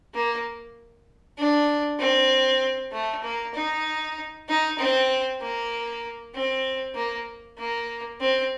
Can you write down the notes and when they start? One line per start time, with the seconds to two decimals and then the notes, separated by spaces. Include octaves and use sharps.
0.14 A#3
1.38 D4
1.99 C4
2.92 A3
3.23 A#3
3.54 D#4
4.48 D#4
4.78 C4
5.41 A#3
6.34 C4
6.95 A#3
7.58 A#3
8.20 C4